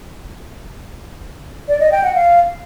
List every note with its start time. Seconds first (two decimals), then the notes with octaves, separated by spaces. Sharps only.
1.68 D5
1.80 D#5
1.92 G5
2.03 F#5
2.15 F5